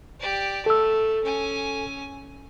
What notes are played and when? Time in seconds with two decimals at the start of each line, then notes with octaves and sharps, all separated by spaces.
0.20 G4 D5
0.66 A3 A4 E6
1.24 C#4 G#5